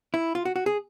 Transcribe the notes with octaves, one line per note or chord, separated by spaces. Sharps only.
E4
F4
F#4
F#4
G#4